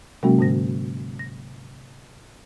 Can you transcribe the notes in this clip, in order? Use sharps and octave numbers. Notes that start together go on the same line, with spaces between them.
C3 F#3 G#3 A#3 C#4 F#4
G#2 D3 A#6
A#6